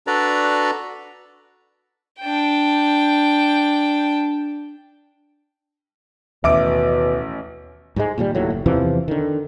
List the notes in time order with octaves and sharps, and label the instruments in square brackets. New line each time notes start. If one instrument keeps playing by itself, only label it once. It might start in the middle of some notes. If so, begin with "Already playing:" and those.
[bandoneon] D4 F#4 A4 B4 D5 A#5
[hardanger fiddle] D4 G5
[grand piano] A1 D6 D7 [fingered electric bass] D#2 [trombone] B2 [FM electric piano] E5
[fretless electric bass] G#2 F#3 G#3
A#2 D#3 E3 G3
D1 D#2 A2 F#3
F#1
E2 C3 E3 F3
D3 D#3